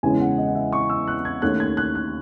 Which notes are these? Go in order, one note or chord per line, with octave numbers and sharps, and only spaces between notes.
E2 C#3 E3 G#3 C#4 G#5
F#5
D#5
F#5
E5
C#6
E6
F#6
G#6
D#2 D#3 A3 C#4 F#6
G#6
F#6
F#6